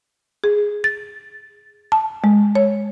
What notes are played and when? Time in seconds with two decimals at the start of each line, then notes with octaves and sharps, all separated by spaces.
0.44 G#4
0.84 A6
1.92 A5
2.24 G#3
2.55 C#5